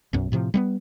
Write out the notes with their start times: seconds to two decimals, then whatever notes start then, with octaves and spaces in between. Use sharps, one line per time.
0.13 B1 F#2
0.32 A2 C3 F3
0.54 G3 A3 B3